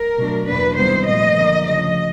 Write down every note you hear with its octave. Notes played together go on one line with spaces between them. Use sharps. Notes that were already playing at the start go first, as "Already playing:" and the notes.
Already playing: A#4
B2 F#3 A3 D4
E2 B2 F#3 A#3 D4 B4
C3 D#3 G3 B3 E4 C5
A#2 F3 A3 D#5
D3 F3 A#3
C#3 F3 A3 D#5